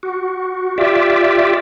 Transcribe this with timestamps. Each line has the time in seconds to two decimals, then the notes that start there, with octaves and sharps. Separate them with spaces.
0.03 F#4
0.78 F4 G4 D5 E5